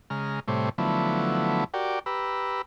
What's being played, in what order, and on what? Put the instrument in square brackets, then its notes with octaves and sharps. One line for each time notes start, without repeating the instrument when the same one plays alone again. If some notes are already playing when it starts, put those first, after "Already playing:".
[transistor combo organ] C#3 G#3 A#5 F6
A2 C3 G3 A3 C5 C#5
D3 F3 F#3 A3 B3 E4
F#4 G4 A#4 D5 G5
G4 B4 A#5 B5 E6